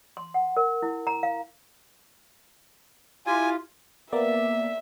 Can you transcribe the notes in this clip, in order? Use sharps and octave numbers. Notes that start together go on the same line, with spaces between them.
C6
F#5
A#4
E4
A#5
F5
E4 F4 G4 G#5
A#3 B3 D5 E5